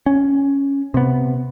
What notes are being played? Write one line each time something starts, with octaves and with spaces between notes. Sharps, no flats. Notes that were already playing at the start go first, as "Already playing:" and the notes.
C#4
C3 B3